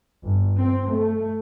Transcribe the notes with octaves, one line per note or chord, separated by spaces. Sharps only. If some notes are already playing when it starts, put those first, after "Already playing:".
G1
C4
A3